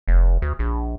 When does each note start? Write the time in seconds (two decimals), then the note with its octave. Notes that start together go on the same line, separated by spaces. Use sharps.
0.08 F1
0.42 D2
0.59 A#1